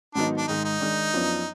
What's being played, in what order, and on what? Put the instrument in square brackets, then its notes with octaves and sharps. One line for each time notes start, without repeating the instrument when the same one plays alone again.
[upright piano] G#2 D#3 F#3 B3 D#4 [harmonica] D4
[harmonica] D4
[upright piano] G#2 D#3 G#3 [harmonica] D#4
[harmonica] D#4
[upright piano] D#3 G#3 D4
F#2 F3 B3 D4